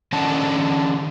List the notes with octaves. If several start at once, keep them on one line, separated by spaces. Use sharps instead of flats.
D#3 C#4 D4 D#5 F#5 A5